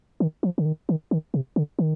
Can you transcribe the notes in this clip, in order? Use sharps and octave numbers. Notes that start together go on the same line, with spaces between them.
D#3
F3
D3
D#3
D#3
D#3
C3
D3
D#3